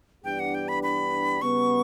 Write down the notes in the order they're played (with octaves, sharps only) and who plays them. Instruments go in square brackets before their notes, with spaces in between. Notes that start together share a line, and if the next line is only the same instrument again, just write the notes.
[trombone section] G2 E3 B3 D4 G4 [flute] G5
[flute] F#5
G5
B5
B5
[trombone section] C#3 G3 B3 [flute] C#6